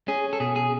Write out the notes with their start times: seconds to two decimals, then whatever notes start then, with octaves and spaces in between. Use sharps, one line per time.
0.08 C#4 G#4
0.33 A4
0.40 B2 G#4
0.56 G#4